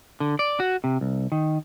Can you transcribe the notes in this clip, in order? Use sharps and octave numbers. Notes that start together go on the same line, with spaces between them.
D3
D5
F#4
C3
C2
D#3